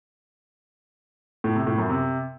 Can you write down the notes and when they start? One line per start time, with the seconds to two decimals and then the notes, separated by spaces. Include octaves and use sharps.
1.44 A2
1.55 C3
1.67 A2
1.78 F#2
1.89 C3